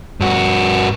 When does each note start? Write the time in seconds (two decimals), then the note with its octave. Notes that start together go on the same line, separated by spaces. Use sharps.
0.20 G2 F#4